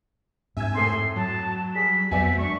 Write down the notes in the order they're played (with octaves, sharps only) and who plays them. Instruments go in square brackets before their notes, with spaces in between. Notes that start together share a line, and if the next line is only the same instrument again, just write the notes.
[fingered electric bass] G#2 [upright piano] C3 G#6 [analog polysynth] E5 G#5 E6
[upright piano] F2 A2 A3 [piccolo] C6
[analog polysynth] F#3 [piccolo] A5
[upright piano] G3 G#4 [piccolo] B6
[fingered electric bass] F2 F#3 [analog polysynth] B3 C4 F#4 [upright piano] D5 E5 G#5
[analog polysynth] F#2 D4 [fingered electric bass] G#3 [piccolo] C#6